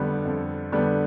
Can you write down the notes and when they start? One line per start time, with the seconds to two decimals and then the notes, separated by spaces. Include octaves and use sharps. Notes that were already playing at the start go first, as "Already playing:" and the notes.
Already playing: F2 D3 G3 B3
0.25 F2
0.72 D3 G3 B3